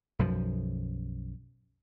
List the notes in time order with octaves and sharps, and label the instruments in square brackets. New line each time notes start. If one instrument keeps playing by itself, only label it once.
[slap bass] B1 F#2 F3